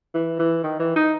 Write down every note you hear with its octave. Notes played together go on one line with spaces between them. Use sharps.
E3
E3
D#3
E3
D#4